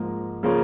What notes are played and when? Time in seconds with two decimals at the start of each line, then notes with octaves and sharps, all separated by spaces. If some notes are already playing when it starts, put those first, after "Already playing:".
Already playing: G#2 F3 A#3
0.43 C#3 F3 A#3 C#4 F4